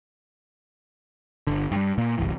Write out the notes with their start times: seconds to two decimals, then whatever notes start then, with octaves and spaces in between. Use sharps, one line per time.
1.47 G1 D3
1.72 G2 G3
1.98 A#2 A#3
2.18 F#1 C2 G2 E3